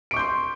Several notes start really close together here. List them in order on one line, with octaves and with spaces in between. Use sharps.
D7 C#6 G6 C6